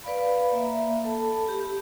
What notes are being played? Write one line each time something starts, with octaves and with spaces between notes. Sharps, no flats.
B4 D5 F5 B5
A#3 E5
A4 A5 B5
G4